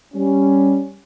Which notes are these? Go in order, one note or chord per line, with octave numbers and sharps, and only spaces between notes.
G3 C#4